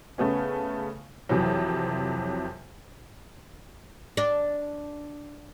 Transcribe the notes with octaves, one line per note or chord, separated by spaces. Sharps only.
C#3 A3 B3 C#4
F2 C3 E3 F#3
D4